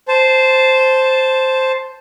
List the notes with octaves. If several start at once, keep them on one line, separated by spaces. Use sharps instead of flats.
C5 A5